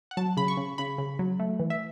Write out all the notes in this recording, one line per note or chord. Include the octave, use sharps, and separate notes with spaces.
F#5
F#3 A5
C#3 B5
C#6
C#3
C#3 B5
C#3
F#3
A3
E3
E5